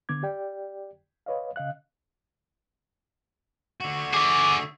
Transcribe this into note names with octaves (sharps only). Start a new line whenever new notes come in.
D3 B3 D6 G#6
G4 D5 G5
B4 C#5 D#5 F5
C#3 D#5 F5 F#6
D3 F#4
G#4 E5 D6